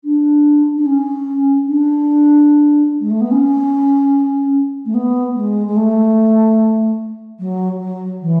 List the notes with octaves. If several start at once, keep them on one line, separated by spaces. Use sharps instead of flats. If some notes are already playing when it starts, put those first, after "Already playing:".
D4
D4
C#4
D4
G#3
A3
B3
C#4
A3
B3
G#3
G#3
A3
F#3
F#3
E3